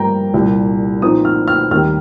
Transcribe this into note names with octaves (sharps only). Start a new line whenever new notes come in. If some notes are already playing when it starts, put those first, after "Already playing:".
Already playing: G2 F3 A#3 G5 A#5
C2 A#2 G3
A#2 F3 C4 D#4 D#6
F6
F6
D#2 D#3 G3 F6